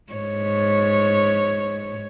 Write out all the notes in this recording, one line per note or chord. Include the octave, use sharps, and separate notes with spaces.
G#2 C#5